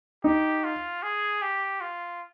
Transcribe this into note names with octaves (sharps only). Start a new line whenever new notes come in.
D#4 G4
F4
G#4
G4
F4